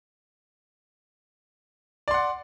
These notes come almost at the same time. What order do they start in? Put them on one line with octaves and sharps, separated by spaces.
D5 C6 F#5